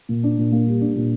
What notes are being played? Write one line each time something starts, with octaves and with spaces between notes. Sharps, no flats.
A#2
D4
A#2
A#3
G3
D4
A#2